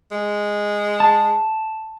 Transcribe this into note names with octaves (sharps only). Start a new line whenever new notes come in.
G#3
A5